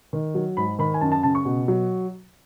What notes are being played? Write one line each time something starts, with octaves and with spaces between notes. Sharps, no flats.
D#3
F#3
G#2 B5
D#3 B5
G#5
F#2 A5
A5
C#3 A5
C#6
B2
F#3